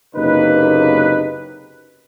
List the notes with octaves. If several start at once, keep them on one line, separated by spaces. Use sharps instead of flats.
F#1 C3 A#3 D#4 B4